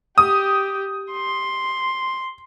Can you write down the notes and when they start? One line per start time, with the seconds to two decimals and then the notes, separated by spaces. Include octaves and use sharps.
0.18 G4 D#6
1.12 C6